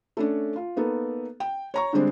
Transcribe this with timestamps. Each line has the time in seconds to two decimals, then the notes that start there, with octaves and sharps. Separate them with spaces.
0.17 A3 C#4 D4
0.56 F4
0.76 A#3 B3 D#4 A4
1.40 G5
1.74 C#5 A#5 C#6
1.93 D3 G3 G#3 C4 D4